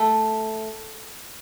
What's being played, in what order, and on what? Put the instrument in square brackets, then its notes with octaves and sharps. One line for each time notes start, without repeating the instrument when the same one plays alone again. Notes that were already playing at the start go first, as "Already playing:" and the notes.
Already playing: [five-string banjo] A3 A4